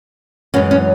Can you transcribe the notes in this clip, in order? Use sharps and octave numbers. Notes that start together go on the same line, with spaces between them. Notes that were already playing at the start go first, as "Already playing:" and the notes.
F#2 E3 G#3 C#4
C#4